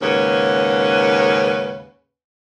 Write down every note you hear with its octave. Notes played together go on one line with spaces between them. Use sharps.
D#2 G#2 C#3 C#4 B4 F#5